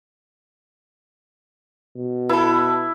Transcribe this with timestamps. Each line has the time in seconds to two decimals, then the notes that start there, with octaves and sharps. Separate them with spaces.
1.96 B2
2.29 E4 A4 B4